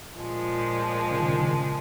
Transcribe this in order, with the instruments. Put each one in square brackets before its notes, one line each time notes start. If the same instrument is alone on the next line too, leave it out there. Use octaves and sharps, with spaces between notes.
[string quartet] A#2 F3 G#3
[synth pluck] C#3
D#3
C#3
D#3
C#3